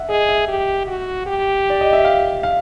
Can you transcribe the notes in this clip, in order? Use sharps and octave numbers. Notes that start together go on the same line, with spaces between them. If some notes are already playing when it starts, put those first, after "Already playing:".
Already playing: E5 F#5
G#4 D#5
E5
G4
F#4
G4
D5
D#5
E5
F5
F5